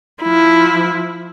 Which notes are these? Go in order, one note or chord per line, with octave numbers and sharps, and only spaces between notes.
F3 E4